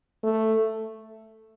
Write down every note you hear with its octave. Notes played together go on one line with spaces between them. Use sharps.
A3